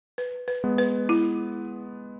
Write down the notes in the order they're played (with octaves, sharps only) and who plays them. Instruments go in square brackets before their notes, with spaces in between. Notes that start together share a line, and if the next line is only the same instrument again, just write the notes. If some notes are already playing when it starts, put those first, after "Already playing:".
[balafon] B4
B4
[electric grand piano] G#3 B3
[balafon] B4
E4